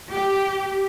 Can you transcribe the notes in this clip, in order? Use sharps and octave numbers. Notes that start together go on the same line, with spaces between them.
G4